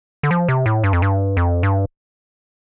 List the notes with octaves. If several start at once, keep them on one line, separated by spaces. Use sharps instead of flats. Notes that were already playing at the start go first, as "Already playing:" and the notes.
D3
F3
C3
A2
G2
F2
G2
F2
G2